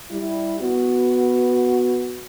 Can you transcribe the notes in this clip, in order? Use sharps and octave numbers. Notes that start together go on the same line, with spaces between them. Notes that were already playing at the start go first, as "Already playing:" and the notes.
G3 E4
B3 F#4